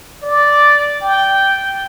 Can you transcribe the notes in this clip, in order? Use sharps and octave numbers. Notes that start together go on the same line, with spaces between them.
D5
G5